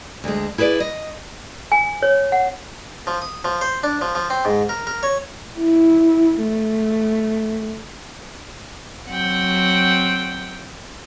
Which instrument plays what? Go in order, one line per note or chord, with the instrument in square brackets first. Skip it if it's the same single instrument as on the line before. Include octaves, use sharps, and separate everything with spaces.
[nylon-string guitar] D2 G#3
E4 G#4 B4 D5
D#5
[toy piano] G#5
C#5
F#5
[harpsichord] F3
D#6
F3
C5
D4
F3
F3
C4
G#2
A#4
A#4
C#5
[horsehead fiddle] E4
A3
[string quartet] F#3 C4 F#5 G5